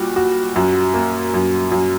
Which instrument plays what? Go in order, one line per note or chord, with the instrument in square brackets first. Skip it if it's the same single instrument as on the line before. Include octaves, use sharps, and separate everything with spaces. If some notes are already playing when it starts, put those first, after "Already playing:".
Already playing: [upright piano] A#2 G3 F#4
F#4
F#2
A#3
F#2
F#2